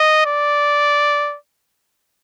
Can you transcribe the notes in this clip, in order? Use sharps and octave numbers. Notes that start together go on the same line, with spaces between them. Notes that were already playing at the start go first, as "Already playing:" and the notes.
Already playing: D#5
D5